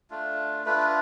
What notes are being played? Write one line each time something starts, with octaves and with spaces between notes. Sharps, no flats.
A3 D4 F4
A3 D4 F4 B4